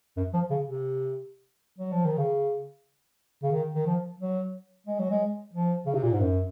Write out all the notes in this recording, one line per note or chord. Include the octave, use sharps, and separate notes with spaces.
F#2
F3
C#3
C3
F#3
F3
D#3
C#3
C#3
D#3
D#3
F3
F#3
G#3
F#3
G#3
F3
C#3
C3
A#2
G#2
F#2